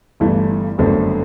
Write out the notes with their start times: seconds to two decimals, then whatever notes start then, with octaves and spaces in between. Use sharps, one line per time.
0.20 G1 G2 E3 A3
0.78 G1 F#2 D3 A3 C4